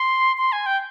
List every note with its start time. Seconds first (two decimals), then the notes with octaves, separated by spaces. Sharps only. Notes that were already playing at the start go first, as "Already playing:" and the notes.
Already playing: C6
0.38 C6
0.52 G#5
0.66 G5